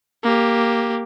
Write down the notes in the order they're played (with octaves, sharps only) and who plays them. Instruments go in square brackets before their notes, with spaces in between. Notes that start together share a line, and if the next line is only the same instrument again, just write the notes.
[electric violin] A#3 G4